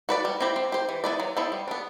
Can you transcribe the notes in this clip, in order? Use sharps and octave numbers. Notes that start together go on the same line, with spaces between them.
F#4 B4 D5
G3
C4 E4 G4
C4
G4 C5
E3
B3 E4 B4 D5
F#3
B3 E4 A4 C5
G3
B3 D4